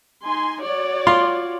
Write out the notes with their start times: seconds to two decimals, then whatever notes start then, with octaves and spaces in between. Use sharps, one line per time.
0.25 D#4 G#5 C6
0.62 F#4 C#5 D5
1.07 F4 C6